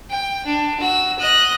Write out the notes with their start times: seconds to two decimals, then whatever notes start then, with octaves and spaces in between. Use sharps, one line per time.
0.10 G5
0.46 D4
0.80 F#4 E6
1.19 D#5 F#6